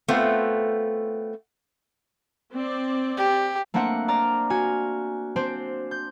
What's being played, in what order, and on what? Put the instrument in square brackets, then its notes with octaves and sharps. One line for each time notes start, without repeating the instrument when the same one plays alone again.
[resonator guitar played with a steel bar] A3 B3 C4 F4
[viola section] C4 D5
[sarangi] G4
[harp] A3 A#3 C4 D4 F#5
D5 A#5 F6
F#4 G#5 F6
C4 D4 C5
G6